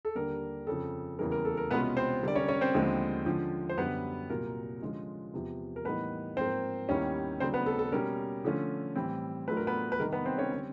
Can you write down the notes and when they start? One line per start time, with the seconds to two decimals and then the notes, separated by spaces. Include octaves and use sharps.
0.05 A4
0.15 D#2 D3 G3 A#3 D4 A#4
0.67 F2 C#3 F3 A4
1.19 E2 C#3 E3 G3 A#3 A#4
1.32 A#4
1.45 A4
1.57 A#4
1.71 C2 B2 G#3 B3 C#4 F4 B4
1.97 C4 C5
2.23 D3 G3 A#3 D5
2.35 C#4 C#5
2.48 C#4 C#5
2.61 C4 C5
2.74 D#2 D3 F3 G#3 B3
3.26 D3 F3 G#3 C#4
3.69 C5
3.78 F#2 D3 G3 B3 B4
4.30 C2 A#2 F#3 A#4
4.81 D3 F3 G#3 C#4 F4
5.34 E2 C3 F3
5.76 A#4
5.85 A2 E3 G3 A#3 B3 D#4 B4
6.37 G#2 F3 A#3 C4 C5
6.89 D#2 D#3 G3 B3 C#4 E4 C#5
7.40 C#3 F#3 A3 C4 D4 C5
7.54 B3 B4
7.66 A4
7.79 A4
7.92 B2 G3 A#3 C#4 A#4
8.44 D3 F3 A3 C#4 F4
8.96 A2 E3 G3 C4 E4
9.48 A2 F#3 A3 D4 F4 B4
9.57 A#4
9.67 B3 B4
9.92 B4
9.99 C3 D#3 G3 A#3 D#4 A#4
10.13 B3 B4
10.25 C4 C5
10.38 C#4 C#5
10.52 D3 G3 C4